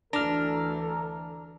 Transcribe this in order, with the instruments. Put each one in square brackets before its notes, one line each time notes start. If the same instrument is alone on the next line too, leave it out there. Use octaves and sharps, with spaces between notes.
[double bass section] D2 E3 [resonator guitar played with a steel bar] D4 [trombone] A4 [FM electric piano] A#5 F6